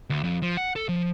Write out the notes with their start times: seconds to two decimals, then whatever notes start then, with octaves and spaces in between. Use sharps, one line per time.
0.10 D2
0.23 F2
0.42 F3
0.57 F#5
0.76 A4
0.89 F3